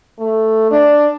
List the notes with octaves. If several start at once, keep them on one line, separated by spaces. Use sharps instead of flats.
A3
D4